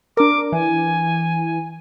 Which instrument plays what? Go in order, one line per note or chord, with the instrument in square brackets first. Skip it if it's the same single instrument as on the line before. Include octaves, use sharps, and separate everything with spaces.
[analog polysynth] D4 A#4 [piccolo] D6
[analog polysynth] E3 [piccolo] G#5